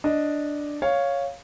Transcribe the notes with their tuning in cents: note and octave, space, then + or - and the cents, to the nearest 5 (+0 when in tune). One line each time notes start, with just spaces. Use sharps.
D4 +0 D#5 +0
C#5 +0 F5 +0